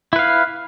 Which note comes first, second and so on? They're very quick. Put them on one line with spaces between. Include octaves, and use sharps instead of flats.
E4 B4 F5